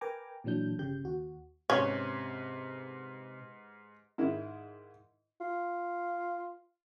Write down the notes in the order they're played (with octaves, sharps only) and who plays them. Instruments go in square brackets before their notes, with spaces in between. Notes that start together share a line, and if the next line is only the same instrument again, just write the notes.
[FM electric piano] A#4 B4 G5 G#5 A#5 D6
A#2 E3 F#3 D4 G6
G1 C#3 G4 G6
D#2 F#4
[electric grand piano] G#2 B4 G#6 [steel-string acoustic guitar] C3 [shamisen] C#4
[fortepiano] G#2 D#3 E4 A#4
[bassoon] F4